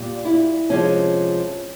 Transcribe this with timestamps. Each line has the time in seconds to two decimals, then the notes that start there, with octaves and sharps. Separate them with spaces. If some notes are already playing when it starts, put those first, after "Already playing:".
Already playing: A#2 G3
0.25 E4
0.69 C3 F3 G#3 C#4